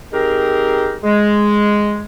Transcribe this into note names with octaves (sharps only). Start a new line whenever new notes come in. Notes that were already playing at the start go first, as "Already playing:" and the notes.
G#3 C4 D#4 G4 A#4
G#3